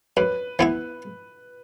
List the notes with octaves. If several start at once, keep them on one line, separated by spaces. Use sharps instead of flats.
F#2 B4
E3 B3 E4